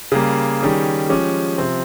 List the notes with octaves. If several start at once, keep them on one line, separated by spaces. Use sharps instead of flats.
C#3 G3 A#3
D#3 G3 C#4 G#4
F3 G#3 C#4 G4
C3 F3 C4